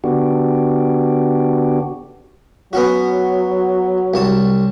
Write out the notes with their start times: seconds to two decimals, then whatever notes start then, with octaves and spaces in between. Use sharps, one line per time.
0.04 D3 B3 D4 F#4 G4
2.73 F#3 B3 C#4 F#4
4.14 C2 C#5 A5